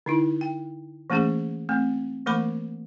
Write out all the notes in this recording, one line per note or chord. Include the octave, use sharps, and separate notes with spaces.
D3 D#4 E4
G5
E3 A3 A#3 C#4 G#4
A3 C4
E3 A3 A#3 A#4 B5 D6